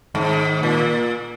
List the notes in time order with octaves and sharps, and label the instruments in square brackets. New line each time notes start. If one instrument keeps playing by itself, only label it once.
[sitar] G#2 [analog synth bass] D#3
[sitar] A#2